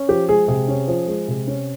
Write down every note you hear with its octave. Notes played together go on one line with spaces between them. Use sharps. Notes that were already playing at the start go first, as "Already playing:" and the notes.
Already playing: C#4
F3 G4
G#3 G#4
C3 G#4
C#4
F3
G#3
C3
C#4